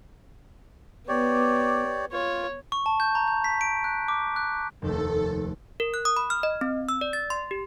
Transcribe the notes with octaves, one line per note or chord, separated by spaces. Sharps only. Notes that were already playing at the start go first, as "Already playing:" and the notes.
B3 G4 C#5 D5
F4 C#5
C#6
A5
G6
A#5
G6
B6
D7
F#6
D6
F#6
F1 D#2 A3 A4
A#4
F#6
D#6
B5
F6
D#5
C4
E6
D5
A6
C6
G4